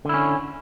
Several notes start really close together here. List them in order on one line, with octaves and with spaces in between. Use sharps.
D3 E4 C#4